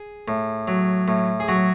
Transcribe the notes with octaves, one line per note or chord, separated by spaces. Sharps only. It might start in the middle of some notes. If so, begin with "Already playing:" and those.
Already playing: G#4
A2
F#3
A2
G#4
F#3 F#4